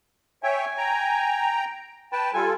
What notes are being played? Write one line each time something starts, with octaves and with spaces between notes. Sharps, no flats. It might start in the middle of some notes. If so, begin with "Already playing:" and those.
C#5 E5 G5 G#5
G5 A#5
B4 G5 A5
G3 F4 A4 G#5